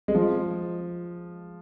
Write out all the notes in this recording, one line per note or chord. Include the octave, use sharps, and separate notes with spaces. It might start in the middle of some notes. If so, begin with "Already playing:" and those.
G#3
F3